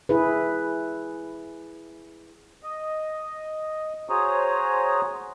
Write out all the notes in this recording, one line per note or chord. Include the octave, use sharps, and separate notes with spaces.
E4 G#4 B4
D#5
F#4 G#4 C5 C#5 A#5 D#6